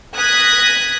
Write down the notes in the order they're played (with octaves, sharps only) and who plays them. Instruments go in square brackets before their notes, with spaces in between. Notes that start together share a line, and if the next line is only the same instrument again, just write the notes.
[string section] D#6 F#6 G#6 A#6 B6